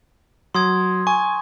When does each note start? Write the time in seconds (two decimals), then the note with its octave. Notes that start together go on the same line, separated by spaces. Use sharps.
0.55 F#3 C6 D#6 G#6
1.07 G#5 C#6